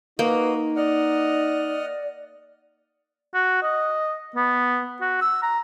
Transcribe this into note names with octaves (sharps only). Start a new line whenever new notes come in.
A#3 D#4 F#4 B4 D#5
D5 D#5 F#5 F6
F#4
D#5
B3
F#4
E6
A#5